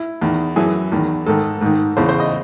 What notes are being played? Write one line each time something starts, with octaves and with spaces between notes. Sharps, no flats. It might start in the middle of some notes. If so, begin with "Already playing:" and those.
Already playing: E4
E2 D#3
F#2 E3 G#4
E2 D#3
G#2 D#3 A4
G#2 D#3
E2 C#3 E3 C5
C5
D#5